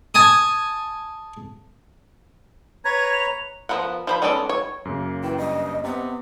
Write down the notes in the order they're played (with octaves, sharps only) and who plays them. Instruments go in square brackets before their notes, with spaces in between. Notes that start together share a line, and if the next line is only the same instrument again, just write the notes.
[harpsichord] G#5 A5 D#6
[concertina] B4 C#5 A#5 [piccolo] G#6
[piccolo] F7
[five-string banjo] F3 B3 F4 A#4 F#5
F3 C5 B5
G#3 B3 C#4 A4 D5
C#5
[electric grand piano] F#2 C#3 A#3
[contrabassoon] E3 [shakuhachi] G5
[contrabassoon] G2 [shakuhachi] D#5
[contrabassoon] C3 [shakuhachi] B3